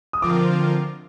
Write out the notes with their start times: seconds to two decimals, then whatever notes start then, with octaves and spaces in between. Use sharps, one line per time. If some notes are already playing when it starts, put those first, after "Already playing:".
0.13 D#6
0.22 D3 F3 C4 F4 A#4 D6